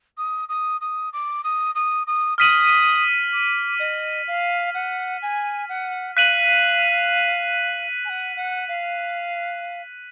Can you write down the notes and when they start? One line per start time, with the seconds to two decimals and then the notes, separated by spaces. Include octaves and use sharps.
0.18 D#6
0.49 D#6
0.81 D#6
1.13 D6
1.44 D#6
1.75 D#6
2.07 D#6
2.38 D#6 F6 B6 D#7 F#7
3.33 D6
3.79 D#5
4.27 F5
4.74 F#5
5.22 G#5
5.69 F#5
6.16 F5 F#6 B6 D#7 F#7
8.05 G#5
8.10 F#5
8.36 F#5
8.68 F5